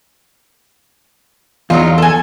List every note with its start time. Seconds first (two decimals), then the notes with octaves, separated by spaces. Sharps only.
1.70 E2 F#3 D#4 F4
1.98 A4 G#5